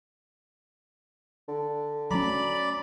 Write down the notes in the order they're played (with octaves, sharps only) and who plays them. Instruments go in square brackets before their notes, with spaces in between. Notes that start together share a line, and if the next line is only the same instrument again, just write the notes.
[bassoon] D3
[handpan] F#3 A3 [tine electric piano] C#4 A#5 [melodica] D5 B5